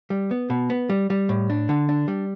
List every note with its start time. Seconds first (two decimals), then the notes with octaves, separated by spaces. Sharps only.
0.10 G3
0.31 B3
0.50 B2
0.70 B3
0.90 G3
1.10 G3
1.29 A2
1.50 D4
1.69 D3
1.89 D4
2.08 G3